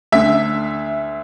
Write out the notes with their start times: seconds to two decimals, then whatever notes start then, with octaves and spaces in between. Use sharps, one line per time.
0.12 D2 D3 E5